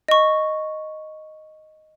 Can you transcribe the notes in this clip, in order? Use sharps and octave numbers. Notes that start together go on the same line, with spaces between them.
D#5 C#6